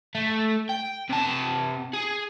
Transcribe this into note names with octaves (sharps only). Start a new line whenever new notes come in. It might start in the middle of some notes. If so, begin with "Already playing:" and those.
A3
G5
C3 A5
G#4